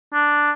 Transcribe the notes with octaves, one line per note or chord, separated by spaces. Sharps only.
D4